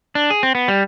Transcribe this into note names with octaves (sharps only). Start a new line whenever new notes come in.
D4
G#4
C4
B3
G3